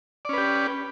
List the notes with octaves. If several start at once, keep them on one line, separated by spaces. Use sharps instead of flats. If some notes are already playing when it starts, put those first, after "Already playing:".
C#4 G4 B4 D5